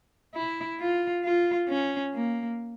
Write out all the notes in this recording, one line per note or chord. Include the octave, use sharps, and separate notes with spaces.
E4
F4
F4
C#4
A#3